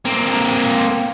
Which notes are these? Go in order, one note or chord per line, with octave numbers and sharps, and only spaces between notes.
A#3 C4